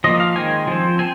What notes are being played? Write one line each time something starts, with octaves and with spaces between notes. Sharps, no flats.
F3 A#3 D#5
F5
D#3 G#3 C4 G#5
F3 C4
C4 G#5